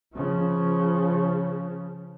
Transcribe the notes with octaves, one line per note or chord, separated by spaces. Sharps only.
C#3 F3